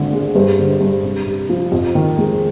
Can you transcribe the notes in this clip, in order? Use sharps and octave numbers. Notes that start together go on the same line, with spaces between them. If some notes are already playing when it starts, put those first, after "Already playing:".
Already playing: G#1 D3
G#3
G2 C5
D3
C5
G2
C3
C3
F3
F2
D#3
G#3